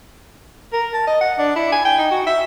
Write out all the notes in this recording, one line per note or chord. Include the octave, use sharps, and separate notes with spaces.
A#4
A5
D#5
F#5
D4
E4
G#5
G5
D#4
F#4
E5